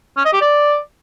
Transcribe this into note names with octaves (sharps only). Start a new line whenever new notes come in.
C#4
D#5
G4
D5